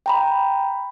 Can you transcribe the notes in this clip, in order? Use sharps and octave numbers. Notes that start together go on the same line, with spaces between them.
G5 A#5 B5